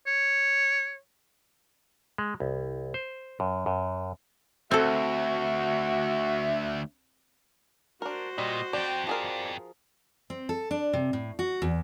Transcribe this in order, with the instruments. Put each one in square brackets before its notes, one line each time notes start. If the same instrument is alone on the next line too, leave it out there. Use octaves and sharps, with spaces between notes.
[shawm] C#5
[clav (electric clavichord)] G#3
C2
C5
F#2
F#2
[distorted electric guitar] D2 [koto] C4 A4 [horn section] F#4 [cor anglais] E5
[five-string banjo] D4 A#4 [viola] F#4 C5
[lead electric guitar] A#2 [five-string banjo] G3 [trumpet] D#5
[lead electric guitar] F2 C4 [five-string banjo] D5 [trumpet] G5
[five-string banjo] F3 G#4 A#4 [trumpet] D5
[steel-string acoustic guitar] C4
A4
D4
C3
A2
F#4
E2